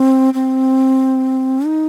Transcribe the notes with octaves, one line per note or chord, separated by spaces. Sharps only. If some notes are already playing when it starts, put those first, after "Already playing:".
Already playing: C4
C4
D#4